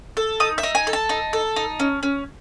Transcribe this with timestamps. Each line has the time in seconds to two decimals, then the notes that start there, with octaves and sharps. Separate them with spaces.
0.17 A4
0.40 D#4 D#6
0.58 E5
0.63 D#4
0.75 G#5
0.87 A4
0.93 A5
1.09 D#4
1.33 A4
1.56 D#4
1.80 C#4
2.03 C#4